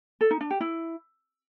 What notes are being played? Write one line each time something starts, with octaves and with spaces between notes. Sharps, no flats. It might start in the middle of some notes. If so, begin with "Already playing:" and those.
A4
D#4
D4
G4
E4